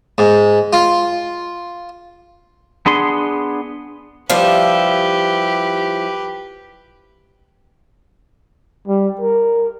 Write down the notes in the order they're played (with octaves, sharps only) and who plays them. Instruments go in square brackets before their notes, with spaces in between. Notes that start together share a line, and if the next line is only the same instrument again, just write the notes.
[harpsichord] G#2
F4
[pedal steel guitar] B3 D4 G#4 C6
[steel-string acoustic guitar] F3 G3 E4 [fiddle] G4 B4 [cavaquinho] F5
[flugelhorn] G3
A#4